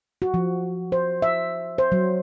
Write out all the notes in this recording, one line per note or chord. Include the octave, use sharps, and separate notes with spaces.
F#4
F3
C5
E5
C5
F#3